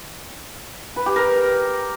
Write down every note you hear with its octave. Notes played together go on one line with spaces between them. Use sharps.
B4
G4
A#4